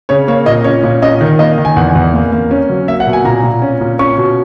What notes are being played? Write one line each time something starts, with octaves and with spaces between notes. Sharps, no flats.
C#3 C#5
A#3 C#5
A#2 D#5
C#4 C#5
A#2
C#4 D#5
D#3
A#3 D#5
D#3
G#5
E2 F#5
E2
A#3
A#3
C#4
F#3
A#3 E5
F#5
B2
G#5
A#2 A#5
A#2
C#4
A#2
C#4 C#6
B2